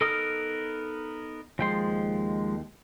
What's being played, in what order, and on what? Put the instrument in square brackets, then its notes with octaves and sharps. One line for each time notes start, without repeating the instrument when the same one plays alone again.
[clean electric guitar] B3 D#4 A#4 [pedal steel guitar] A4 D#6 F6
[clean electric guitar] D#2 G5 C6 [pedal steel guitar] F3 G#3